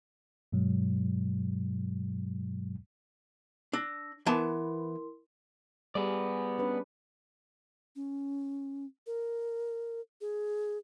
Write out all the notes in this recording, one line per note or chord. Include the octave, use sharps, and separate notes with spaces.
G2 B2 F#3 G#3
D4 E6 A#6
E3 B3 E4 A#4 A5 C6
G3 B3 G#4 D5
C#4 D4 B4
C#4
A#4
G#4